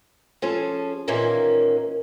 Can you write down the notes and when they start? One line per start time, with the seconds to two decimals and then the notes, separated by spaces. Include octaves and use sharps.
0.42 F3 C#4 G#4 A4
1.08 A#2 D#3 E3 A#3 C#4 D#4